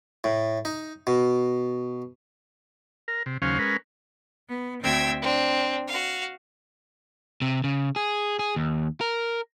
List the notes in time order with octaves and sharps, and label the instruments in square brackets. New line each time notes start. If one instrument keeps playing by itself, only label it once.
[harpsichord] A2
D#4
B2
[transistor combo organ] A#4
C3
D#2 C#3 F#3 C#4 C5 F5
G#3 C#4 A#4 B4
[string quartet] B3
D2 C4 E5 G5 G#6
C4 D4
F#4 F5
[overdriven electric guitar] C3
C#3
G#4
G#4
D#2
A#4